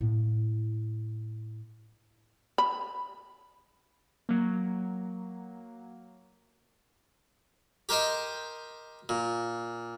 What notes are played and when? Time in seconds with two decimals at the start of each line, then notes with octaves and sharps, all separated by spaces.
0.01 A2 A#3
2.58 B5
4.29 F#3 A#3
7.89 G4 A#4 C5 D#5 G5
9.09 A#2